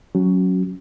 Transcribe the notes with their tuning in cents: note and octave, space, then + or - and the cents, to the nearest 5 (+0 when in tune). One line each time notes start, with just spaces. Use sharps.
F#3 +0 C#4 +0 F#4 +5